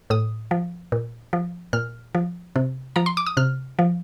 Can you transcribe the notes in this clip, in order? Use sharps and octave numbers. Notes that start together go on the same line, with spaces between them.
A2 D#6
F3
A#2
F3
A#2 F6
F3
C3
F3 A#5
C6
D6
D#6
C3 F6
F3